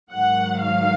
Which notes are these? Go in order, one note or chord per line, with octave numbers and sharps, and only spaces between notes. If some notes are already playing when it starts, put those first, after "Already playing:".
G#2 D#3 F#3 F#5
F5